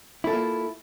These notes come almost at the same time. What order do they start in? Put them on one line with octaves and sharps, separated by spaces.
E4 A4 F4 A#3